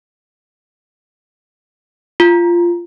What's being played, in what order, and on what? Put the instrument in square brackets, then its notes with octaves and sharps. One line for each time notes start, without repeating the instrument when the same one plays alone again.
[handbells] F4